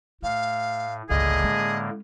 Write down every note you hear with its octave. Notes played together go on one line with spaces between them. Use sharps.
A2 A3 F5
G1 C#2 A2 D3 A#3 G#4 D#5
G#3 C#4